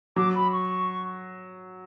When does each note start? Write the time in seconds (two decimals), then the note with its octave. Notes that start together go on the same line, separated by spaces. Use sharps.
0.16 F#3 D6
0.35 B5
0.52 C#6